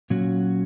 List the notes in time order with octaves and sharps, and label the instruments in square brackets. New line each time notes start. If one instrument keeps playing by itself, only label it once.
[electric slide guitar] A#2 F#3 C#4 F#4